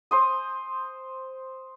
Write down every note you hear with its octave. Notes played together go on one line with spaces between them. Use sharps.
C5 C6 D#6